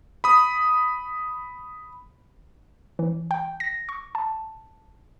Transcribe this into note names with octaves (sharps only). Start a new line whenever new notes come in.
B5 D#6
E3
G5
A#6
C#6
A5